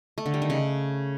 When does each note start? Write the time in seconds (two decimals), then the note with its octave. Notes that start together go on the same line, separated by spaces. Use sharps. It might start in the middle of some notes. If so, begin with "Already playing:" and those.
0.18 A3
0.26 D3
0.34 G3
0.42 D#3
0.50 C#3